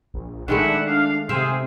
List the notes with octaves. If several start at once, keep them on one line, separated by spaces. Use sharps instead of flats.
A#1
D#3 G#3 A3 D4 E4 E5 F#5
F5
C3 C4 G#4 C5 E5 F5